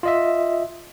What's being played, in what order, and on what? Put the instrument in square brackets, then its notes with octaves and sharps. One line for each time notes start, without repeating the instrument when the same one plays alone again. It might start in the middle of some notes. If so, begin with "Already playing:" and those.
[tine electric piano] F4 D#5 E5